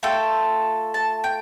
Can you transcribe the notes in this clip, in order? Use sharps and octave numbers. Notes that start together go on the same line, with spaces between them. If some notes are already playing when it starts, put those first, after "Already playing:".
A3 F4 A4 G5
A5
G5